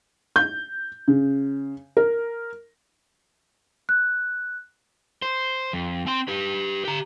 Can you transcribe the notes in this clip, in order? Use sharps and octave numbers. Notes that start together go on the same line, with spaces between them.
G6
C#3
A#4
F#6
C5
F2
C4 C6
G4 B4
G4 A#5